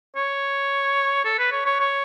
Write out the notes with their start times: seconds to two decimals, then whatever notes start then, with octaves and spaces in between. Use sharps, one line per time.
0.16 C#5
1.25 A4
1.39 B4
1.52 C#5
1.66 C#5
1.80 C#5